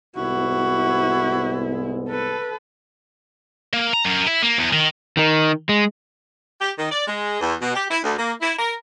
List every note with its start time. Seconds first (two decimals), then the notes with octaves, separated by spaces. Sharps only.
0.16 C2 G#2 B3 E4 F#4
2.09 A4 B4
3.73 A#3
3.93 A#5
4.05 F#2
4.27 E4
4.42 A#3
4.58 E2
4.73 D#3
5.17 D#3 D#4
5.69 G#3
6.61 G4
6.78 D#3
6.90 D5
7.07 G#3
7.41 E2
7.60 B2
7.74 G4
7.90 E4
8.03 D2
8.17 A#3
8.40 E4
8.58 A#4